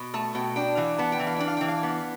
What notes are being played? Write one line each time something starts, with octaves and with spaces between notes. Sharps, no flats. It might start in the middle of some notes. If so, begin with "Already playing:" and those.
Already playing: B2
A3 A5
B2 G5
D4 G5
E3 F5
B3 A5
G5
E3
F5
D4 G5
F5
E3 G5
F5
B3